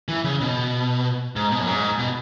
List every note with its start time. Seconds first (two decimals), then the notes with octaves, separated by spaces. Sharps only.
0.08 E3
0.24 C#3
0.41 B2
1.36 G#2
1.51 B2
1.61 F#2
1.67 G#2
1.99 B2